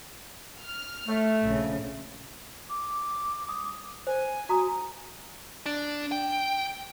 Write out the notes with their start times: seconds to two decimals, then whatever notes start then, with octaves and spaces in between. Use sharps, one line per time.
0.63 F6
1.07 A3
1.46 A#1 C#3
2.69 D6
3.49 D#6
4.07 C5 G#5
4.49 F#4 A#5 D#6
5.66 D4
6.12 G5